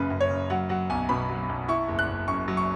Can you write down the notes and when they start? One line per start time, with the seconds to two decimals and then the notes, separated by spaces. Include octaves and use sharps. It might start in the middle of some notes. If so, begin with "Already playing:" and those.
Already playing: F#1 F#2 C#3 B4
0.10 F#2
0.21 C#5
0.30 C#3
0.50 F#3 F#5
0.69 F#3 F#5
0.90 B1 G#5
1.09 B2 B5
1.30 F#3
1.49 B1
1.68 E4 C#6
1.88 F#1
1.99 F#6
2.08 F#1
2.28 F#2 C#6
2.48 F#3
2.57 C#6